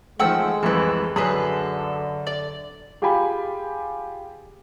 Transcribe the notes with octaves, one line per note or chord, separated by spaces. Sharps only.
D#3 F3 G#3 A3 F#5 G5 E6
C2 F2 E3 A4 B4
F#2 D3 G#4 A4 B4
D5
F4 G4 G#4 G5 G#5 B5